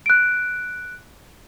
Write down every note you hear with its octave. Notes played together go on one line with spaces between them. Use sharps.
F#6 D7